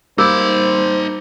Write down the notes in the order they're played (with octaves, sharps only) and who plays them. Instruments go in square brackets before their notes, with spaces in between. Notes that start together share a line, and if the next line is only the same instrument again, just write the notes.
[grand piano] G3 A#3 [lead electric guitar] D#4 B5 [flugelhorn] C5 [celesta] D6 E6 G6